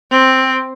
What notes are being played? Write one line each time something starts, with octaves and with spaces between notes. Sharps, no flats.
C4